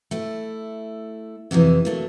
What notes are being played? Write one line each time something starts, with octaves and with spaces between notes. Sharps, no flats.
A3 E4
F2 C3 D#3 E3
F#3 A3 A#3